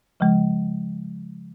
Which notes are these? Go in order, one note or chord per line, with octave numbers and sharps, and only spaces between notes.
C#3 F3 G#3